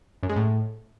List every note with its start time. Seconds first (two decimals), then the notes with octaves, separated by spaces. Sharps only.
0.23 F#2
0.29 G#3
0.36 A2